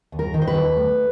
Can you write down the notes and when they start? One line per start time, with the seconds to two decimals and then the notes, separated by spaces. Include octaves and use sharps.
0.12 D#2
0.19 A#4
0.34 D#3
0.42 C5
0.47 B4
0.55 D#2
0.77 A3